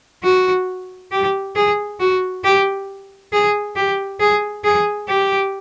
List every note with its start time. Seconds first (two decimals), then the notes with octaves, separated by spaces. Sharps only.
0.23 F#4
1.12 G4
1.56 G#4
2.00 F#4
2.44 G4
3.32 G#4
3.76 G4
4.20 G#4
4.64 G#4
5.08 G4